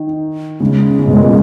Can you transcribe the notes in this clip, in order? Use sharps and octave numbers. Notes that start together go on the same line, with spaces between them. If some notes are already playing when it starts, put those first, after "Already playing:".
Already playing: D#3
C#3 G#3
C#3
B2
A#2